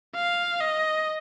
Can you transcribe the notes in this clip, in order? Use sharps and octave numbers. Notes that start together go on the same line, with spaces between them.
F5
D#5